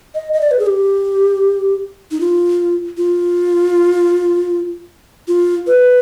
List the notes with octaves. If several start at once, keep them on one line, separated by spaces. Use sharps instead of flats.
D#5
D#5
D5
B4
G#4
G4
D#4
F4
F4
F4
B4